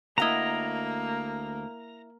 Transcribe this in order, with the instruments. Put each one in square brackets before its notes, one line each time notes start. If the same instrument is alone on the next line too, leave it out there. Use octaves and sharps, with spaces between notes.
[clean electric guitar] D2 D#5 [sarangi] A#3 [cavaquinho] E4 F#4 F#5 [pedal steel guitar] A#5